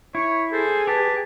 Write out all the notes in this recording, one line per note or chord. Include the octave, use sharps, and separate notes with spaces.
E4 C#5
G#4 A4 C5
G4 B4 A5